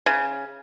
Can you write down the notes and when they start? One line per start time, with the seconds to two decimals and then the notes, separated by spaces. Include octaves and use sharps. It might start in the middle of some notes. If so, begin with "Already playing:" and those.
0.06 C#3